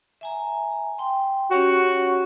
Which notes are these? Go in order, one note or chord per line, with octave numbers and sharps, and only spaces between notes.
E5 G#5 A#5
G5 C6
C#4 F#4 G4 C#5